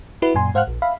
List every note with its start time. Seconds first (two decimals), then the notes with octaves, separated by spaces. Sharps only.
0.22 E4 F#4 B4
0.35 F#2 A#2 G#5 C6
0.54 G#2 C5 F5 F#5 F6 F#6
0.67 A#1
0.82 E5 F5 B5